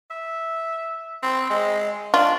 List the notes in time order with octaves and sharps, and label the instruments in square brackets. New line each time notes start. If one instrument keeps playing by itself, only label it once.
[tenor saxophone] E5
C4
G#3
[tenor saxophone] D4 [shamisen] F4